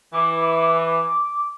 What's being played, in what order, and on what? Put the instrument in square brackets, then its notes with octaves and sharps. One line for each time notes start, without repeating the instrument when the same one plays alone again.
[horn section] E3 [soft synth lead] D6
[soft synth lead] D6